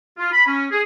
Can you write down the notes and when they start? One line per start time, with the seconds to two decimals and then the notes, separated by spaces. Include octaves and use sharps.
0.18 F4
0.32 B5
0.46 C#4
0.71 G#4